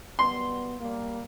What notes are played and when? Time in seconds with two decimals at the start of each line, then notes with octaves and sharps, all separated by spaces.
0.19 F#3 G3 B3 C6
0.80 G3 A#3